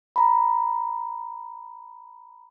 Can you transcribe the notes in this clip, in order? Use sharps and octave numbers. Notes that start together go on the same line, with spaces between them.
A#5 B5